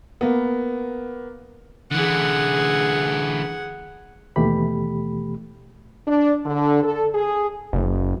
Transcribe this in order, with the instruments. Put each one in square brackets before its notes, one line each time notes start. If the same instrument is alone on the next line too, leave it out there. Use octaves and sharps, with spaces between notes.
[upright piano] A#3 B3
[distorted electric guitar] D3 E3 [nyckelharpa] G#4 F#5
[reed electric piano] D#2 B2 E3 A3 G4 B5
[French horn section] D4
D3
A4
G#4
[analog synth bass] F#1